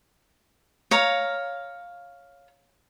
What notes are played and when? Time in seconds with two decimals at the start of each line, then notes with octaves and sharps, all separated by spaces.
0.91 C#5 F5 A#5